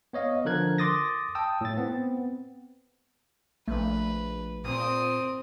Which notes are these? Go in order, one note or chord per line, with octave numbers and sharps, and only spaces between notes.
B3 C#5 D#5 F5
D3 F3 A#4 F#6 G#6
C6 D6 D#6 A6 A#6
G5 A5 D#6 E6
A2 A6
B3 C4
A#1 A3 B4
A#2 C4 D#6